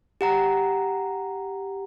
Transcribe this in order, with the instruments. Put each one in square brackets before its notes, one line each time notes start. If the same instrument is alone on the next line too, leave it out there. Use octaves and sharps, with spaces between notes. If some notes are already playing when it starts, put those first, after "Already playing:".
[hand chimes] G4 F#5 A#5